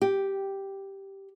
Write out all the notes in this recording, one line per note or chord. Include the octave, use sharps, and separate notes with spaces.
G4